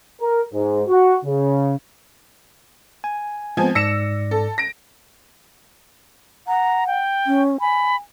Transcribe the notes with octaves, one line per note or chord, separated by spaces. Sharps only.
A#4
G#2
F#4
C#3
G#5
F3 G#3 B3 C4 G#5
G#2 D5 E6 A#6 C#7 E7
A4
A#6 D7
F#5 A#5
G5
C#4
G#5 B5